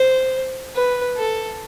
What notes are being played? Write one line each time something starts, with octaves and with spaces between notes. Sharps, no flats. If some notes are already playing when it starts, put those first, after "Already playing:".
Already playing: C5
B4
A4